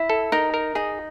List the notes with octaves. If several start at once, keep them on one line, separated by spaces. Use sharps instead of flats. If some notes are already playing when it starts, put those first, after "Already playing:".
Already playing: E4
A4
D#4 A#4
A#4
D#4 G#4